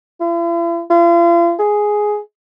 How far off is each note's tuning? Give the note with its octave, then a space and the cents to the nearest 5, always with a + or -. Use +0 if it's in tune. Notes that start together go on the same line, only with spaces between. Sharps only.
E4 +45
F4 -40
G#4 +5